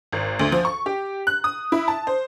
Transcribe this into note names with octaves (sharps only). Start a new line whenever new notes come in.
G#1
D2
F3
C#6
G4
F#6
D#6
E4
A5
C5